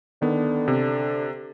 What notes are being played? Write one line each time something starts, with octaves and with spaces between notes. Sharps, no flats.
D3 D#3 B3
C3